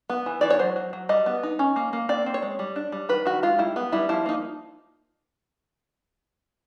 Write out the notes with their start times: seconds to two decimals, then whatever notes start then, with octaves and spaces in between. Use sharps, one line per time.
0.10 B3
0.26 E3
0.41 E3 D5
0.50 C#5
0.59 F#3 C5
0.76 F#3
0.93 F#3
1.09 G3 D#5
1.26 B3
1.43 D#4
1.59 C#4
1.76 A#3
1.93 A#3
2.09 C4 D5
2.26 C4
2.34 C#5
2.42 G#3
2.59 G3
2.76 D4
2.92 G3
3.09 D#3 B4
3.25 D#3 F#4
3.43 G#3 F4
3.59 G3 E4
3.76 B3
3.92 G3 E4
4.09 F3 E4
4.26 A#3 D#4